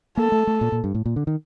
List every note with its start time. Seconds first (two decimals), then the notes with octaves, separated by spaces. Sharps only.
0.17 A#3 A4
0.32 A3
0.47 A3
0.61 A#2
0.72 A#2
0.84 G2
0.94 A2
1.06 A#2
1.16 D3
1.27 D#3